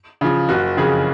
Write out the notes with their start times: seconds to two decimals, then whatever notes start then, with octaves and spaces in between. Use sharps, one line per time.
0.21 C#3 F3
0.49 F#1 F#4
0.77 F2 C#3 G#4